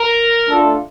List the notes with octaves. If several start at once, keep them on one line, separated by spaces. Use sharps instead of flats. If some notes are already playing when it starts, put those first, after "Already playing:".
Already playing: A#4
A3 D4 F4 A4